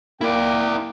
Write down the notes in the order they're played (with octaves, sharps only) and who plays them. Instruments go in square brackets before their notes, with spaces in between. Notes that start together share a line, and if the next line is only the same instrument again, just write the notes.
[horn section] A#3 G5 [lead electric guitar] E4 D5